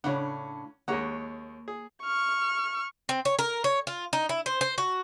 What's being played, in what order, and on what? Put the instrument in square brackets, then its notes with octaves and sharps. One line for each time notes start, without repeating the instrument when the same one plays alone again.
[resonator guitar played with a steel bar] A2 C#3 D4 [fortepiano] C#4 F#5
[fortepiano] D#2 G#3 F#5 [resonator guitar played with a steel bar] A#3 C#5
[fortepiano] G#4
[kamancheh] C#6 F6
[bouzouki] C4
C#5
A#4
C#5
F4
D#4
E4
C5
C5
F#4